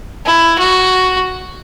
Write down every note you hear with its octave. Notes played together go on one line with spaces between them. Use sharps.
E4
F#4